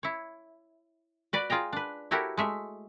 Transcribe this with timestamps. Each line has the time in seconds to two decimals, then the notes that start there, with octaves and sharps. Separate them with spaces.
0.03 E4 C#5
1.33 F#4 B4 D5
1.50 F4 G#4 G5 A#5
1.73 D4 B4
2.11 E4 F#4 G4 A4 A#4 C#5
2.37 G#3 A3 E5